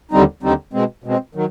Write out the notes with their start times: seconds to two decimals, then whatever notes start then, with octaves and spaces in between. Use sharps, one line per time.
0.11 D#2 D3 G3 C4 D#4
0.43 D#2 D3 G3 C4 D#4
0.73 B2 G#3 C4
1.04 B2 G#3 C4
1.35 D#3 F#3